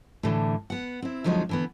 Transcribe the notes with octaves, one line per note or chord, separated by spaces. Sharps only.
A2 D3 E3
B3 F#5
C4 E4
F2 D3 F3 F#3 G#3 D#4
D3 E3 B3